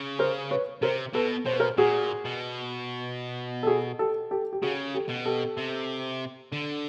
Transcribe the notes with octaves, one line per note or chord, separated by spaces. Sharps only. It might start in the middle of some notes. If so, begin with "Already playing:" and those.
Already playing: C#3
A#4 C5
B4 C#5
C3 A#4 C5
B2 A4 B4
B2 C5
B4
A#4 C5
A#2 F#4 G#4
B2
A4
F#4 G#4
G4 A4
G4 A4
G4
C#3 F#4 G#4
G4 A4
B2
G4 A4
C3
D3